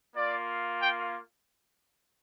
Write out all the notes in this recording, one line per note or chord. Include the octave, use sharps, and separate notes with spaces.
A#3 F4 D5
G5